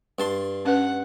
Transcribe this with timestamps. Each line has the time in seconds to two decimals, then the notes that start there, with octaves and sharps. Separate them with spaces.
0.19 G2 A5 C6
0.65 C#4 B4 F#5